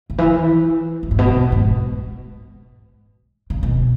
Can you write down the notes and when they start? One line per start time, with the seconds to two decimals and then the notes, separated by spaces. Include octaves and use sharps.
0.10 C#3
0.18 E3
1.03 F#2
1.11 G#2
1.19 B2
1.52 G#2
3.50 C#3
3.63 B2